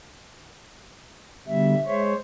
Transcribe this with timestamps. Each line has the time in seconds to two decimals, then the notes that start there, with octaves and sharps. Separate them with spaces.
1.47 B2 D3 G3 E5
1.86 G#3 C5 C#5